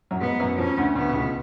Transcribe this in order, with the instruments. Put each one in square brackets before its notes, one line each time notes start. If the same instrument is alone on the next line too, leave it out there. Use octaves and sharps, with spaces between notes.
[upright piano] F#2 F#3
[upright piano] G#2 G#3 [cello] B3
[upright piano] F#2 F#3
[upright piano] F2 F3 [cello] C#4
[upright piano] D2 D3
[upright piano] D2 D3 [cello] B3
[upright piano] B2
C#2 C#3